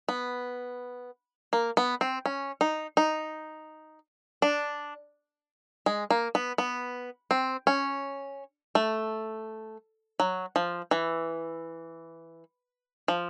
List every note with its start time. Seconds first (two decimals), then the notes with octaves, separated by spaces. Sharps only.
0.09 B3
1.53 A#3
1.77 B3
2.01 C4
2.26 C#4
2.61 D#4
2.97 D#4
4.42 D4
5.86 G#3
6.10 A#3
6.35 B3
6.58 B3
7.31 C4
7.67 C#4
8.75 A3
10.20 F#3
10.56 F3
10.91 E3
13.08 F3